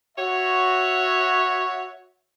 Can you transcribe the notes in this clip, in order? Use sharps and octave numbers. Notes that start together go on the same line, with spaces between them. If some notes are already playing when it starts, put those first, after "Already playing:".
F#4 C#5 E5